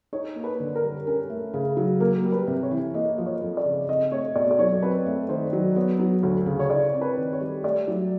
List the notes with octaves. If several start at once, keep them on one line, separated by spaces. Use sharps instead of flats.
D#4 C#5
A#3
B4
D3
A#4
G3
C#4 A#4
A3
C#3
F#3
A#3 A#4
G3
B4
C3
C#5
E3
A#3 D#5
F3
C#5
F2
D5
C#3
C4 D#5
A3 C#5
B2 D5
D5
F#3 C#5
C4 B4
A3
D#3 C5
F#3
B3 C#5
F#3
D2 C#5
C#3
C#5
E4 D5
C4
B4
D#3
C#5
G3
A3 D5
F#3